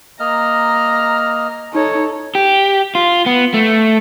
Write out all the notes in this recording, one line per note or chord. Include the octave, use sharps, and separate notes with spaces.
A#3 D#5 A#5 F6
D#4 A4 C#5
G4
F4
B3
A3